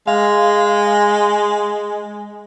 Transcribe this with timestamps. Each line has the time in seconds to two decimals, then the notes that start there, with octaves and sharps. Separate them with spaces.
0.07 G#3 F5